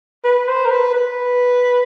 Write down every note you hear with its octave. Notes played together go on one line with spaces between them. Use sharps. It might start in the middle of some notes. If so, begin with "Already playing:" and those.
B4
C5
A#4
B4
B4